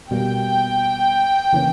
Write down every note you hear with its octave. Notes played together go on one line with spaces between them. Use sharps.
B2 G3 A#3 G5
C#3 E3 A#3 C#4